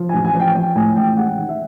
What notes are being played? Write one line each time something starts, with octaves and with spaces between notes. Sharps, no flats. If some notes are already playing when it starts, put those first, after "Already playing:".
Already playing: F3
A1 G#5
G#5
F3
G5
F3 G5
A2 G#5
A1 G5
G#3 F#5
D#3
E5